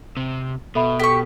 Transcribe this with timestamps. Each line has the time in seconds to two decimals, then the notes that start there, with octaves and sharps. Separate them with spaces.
0.17 C3
0.75 B2 A4 E5 B5
1.00 G4 A4 C#6 B6